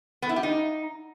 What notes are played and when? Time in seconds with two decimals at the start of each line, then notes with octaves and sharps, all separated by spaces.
0.22 B3
0.29 E4
0.36 G4
0.43 D#4